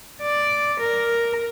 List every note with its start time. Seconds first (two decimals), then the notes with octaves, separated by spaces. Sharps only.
0.22 D5
0.80 A#4